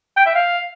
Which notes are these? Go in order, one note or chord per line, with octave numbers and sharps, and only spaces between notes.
G5
E5
F5